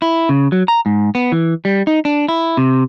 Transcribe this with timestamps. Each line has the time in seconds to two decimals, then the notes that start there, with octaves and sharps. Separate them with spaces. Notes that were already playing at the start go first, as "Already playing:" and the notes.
0.02 E4
0.29 C#3
0.52 F#3
0.68 A#5
0.86 G#2
1.15 B3
1.32 E3
1.65 G3
1.87 D#4
2.05 D4
2.29 E4
2.57 C3